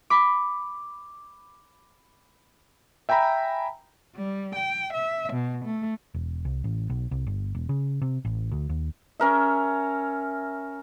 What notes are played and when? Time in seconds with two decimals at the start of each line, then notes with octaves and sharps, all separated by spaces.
0.10 B5 D6
3.09 E5 G5 G#5 A#5 B5
4.16 G3
4.55 G5
4.94 E5
5.33 B2
5.65 A3
6.14 E1
6.45 C2
6.64 A1
6.90 B1
7.11 C2
7.27 G1
7.55 E1
7.69 C#3
8.02 C3
8.25 A1
8.51 D2
8.69 D#2
9.20 C#4 A#4 E5